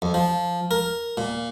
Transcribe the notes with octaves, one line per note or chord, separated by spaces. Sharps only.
F2
F3
A#4
A#2